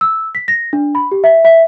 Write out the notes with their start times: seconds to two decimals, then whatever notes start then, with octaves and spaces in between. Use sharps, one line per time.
0.01 E6
0.35 B6
0.48 A#6
0.73 D4
0.95 B5
1.11 G4
1.24 E5
1.45 E5